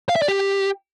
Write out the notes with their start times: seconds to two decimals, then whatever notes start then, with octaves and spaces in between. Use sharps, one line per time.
0.09 F5
0.16 E5
0.22 D5
0.28 G4